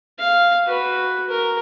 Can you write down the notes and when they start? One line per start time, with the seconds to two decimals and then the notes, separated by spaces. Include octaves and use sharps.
0.19 F5
0.68 F#4 B4
1.30 A#4